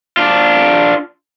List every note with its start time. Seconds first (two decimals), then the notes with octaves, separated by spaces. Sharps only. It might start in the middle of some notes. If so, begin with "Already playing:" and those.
0.17 D4 F4